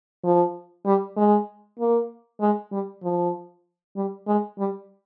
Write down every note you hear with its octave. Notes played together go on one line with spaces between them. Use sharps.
F3
G3
G#3
A#3
G#3
G3
F3
G3
G#3
G3